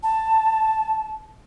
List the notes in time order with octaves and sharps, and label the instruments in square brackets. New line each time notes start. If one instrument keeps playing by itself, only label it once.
[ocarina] A5